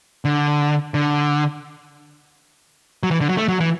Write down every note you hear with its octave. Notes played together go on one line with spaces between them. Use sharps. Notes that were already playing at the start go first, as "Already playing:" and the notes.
D3
D3
F#3
E3
D3
F#3
A3
F#3
E3